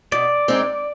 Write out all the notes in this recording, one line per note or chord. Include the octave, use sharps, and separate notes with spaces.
B2 D5
G#3 C4 D#4